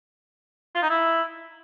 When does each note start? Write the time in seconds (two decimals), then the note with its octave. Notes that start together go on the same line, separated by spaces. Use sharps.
0.75 F4
0.82 D#4
0.90 E4